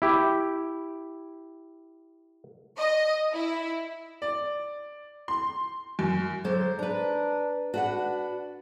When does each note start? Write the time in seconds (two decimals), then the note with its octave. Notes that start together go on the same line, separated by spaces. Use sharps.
0.02 E4 G4
2.79 D#5
3.33 E4
4.22 D5
5.28 C6
5.99 F#2
6.44 D3 F#3 C5
6.79 D4 B4 A#5
7.74 D4 F#4 B4 F#5